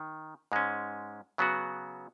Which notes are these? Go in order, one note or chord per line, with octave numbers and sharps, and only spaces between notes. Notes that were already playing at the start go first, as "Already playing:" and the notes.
Already playing: D#3
G#2 G#3 C#4
C#3 F#3 B3 F#4